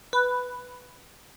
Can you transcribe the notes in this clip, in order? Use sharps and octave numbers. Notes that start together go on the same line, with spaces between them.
B4